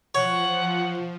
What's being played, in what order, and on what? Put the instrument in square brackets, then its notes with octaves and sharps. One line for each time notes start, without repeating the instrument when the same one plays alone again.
[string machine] F3 [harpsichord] C#5 [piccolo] F#5